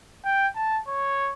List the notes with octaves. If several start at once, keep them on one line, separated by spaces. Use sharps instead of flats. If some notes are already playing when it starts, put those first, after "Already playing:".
G5
A5
C#5